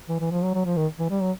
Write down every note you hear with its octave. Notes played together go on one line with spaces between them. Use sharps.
E3
E3
F3
F#3
F#3
F3
D#3
E3
G3
F#3